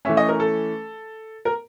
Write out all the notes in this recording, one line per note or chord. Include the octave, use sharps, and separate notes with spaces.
E3 A3 C#4 E5
D#5
A#4
A4
A#4